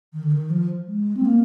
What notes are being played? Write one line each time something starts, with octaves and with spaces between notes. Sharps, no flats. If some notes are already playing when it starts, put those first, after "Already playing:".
D#3
D3
D#3
F3
G#3
C4
A#3